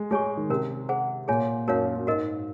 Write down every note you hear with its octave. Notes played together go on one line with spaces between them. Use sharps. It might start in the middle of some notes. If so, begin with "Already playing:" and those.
Already playing: G#3
G#3 G#4 C#5 G#5 C#6
D#3
C3 C#4 F#4 A#4
G#4 C5 F#5
A#2 F4 G#4 C#5 G#5
F#2 D#4 F#4 A#4 C#5 F5
F#2
G#2 F#4 A#4 D#5